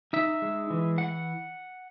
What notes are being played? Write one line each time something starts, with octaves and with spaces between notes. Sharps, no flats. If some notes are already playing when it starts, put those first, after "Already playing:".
D#4 E5
G#3
E3
F#5